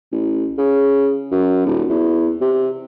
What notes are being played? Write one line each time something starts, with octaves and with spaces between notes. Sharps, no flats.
A1
C#3
F#2
D#1
E2
C3